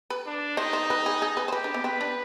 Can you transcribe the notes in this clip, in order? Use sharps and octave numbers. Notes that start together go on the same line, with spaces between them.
B4
D4
D#4 C5
C5
B4
G#4
G#4
B4
C5
G4 B4
D4
B3
C4 B4
D4